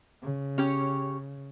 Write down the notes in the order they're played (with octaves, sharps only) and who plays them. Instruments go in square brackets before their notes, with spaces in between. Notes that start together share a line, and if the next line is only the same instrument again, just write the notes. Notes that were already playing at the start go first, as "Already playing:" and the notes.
[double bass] C#3
[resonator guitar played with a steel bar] C#4 G4 C#5